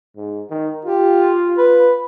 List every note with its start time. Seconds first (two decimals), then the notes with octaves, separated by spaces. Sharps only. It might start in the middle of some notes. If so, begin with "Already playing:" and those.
0.16 G#2
0.50 D#3
0.85 F4 G4
1.58 B4